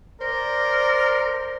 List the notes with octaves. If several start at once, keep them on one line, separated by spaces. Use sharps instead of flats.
A#4 C5 D5